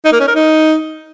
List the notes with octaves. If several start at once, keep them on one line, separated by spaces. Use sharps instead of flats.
D#4
A#3
C#4
A#4
D#4